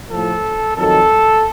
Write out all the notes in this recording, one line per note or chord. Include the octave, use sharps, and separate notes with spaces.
A2 F3 A4
F2 D#3 F#3 A4